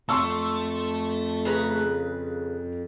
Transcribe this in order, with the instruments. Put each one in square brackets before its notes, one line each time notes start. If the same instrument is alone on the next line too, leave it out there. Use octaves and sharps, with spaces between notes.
[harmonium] F2 [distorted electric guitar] A3 [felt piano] C6 C#6 E6
[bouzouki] C#3 B4 A#5